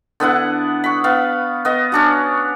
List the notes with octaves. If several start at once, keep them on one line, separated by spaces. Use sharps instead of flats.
D3 B3 E4 F#5
B5 C#6
B3 F5
B3 D#5
C#4 D4 F#4